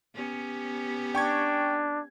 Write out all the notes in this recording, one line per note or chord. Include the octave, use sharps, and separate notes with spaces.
B3 C#4 G4
D4 G5 C#6 G#6